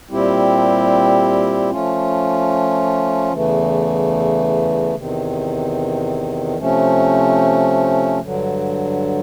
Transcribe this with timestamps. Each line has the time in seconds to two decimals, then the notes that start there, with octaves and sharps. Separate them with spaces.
0.08 A#2 G3 C4 E4 G4
1.70 F3 A3 C#4 F4
3.32 E2 C#3 E3 A3
4.95 E2 C3 D#3
6.57 C3 F3 A3 C#4
8.20 G2 D3 F#3